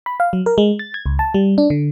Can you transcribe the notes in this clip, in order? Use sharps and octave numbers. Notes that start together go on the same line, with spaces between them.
B5
F5
F#3
A#4
G#3
A6
G#6
C#2
A5
G3
D4
D3